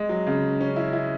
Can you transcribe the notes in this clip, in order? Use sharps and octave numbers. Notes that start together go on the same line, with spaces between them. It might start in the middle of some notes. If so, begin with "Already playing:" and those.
Already playing: G#3
F#3
C#3
C#4
E4
E4